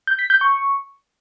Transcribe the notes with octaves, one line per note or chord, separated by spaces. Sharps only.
G6
B6
G6
C#6